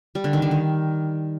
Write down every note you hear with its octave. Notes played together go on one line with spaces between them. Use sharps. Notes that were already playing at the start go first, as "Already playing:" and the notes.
G3
D3
D#3
D3
D#3